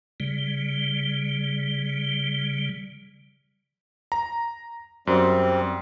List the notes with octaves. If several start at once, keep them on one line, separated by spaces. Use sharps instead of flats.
C#3 G3
A#5
F#2 G3 C4